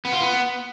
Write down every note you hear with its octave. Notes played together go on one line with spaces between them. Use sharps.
B3
F4
B3